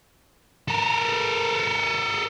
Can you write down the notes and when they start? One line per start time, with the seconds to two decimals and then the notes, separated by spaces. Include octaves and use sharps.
0.68 A4 A#4